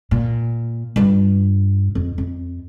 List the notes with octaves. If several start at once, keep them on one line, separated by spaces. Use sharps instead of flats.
A#2
G2 F4
F2
F2